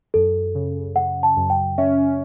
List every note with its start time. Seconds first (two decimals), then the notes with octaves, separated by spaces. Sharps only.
0.14 F#2 A4
0.55 C#3
0.96 C#3 F#5
1.23 A5
1.37 F#2
1.50 G5
1.78 C#4 E5